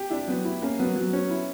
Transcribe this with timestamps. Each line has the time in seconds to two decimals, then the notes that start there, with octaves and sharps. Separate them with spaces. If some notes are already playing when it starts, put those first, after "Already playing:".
Already playing: G4
0.10 D4 E4
0.27 F#3 B3
0.45 E4
0.62 A#3 C#4
0.79 F#3 B3
0.96 F#3
1.13 C#4
1.30 E4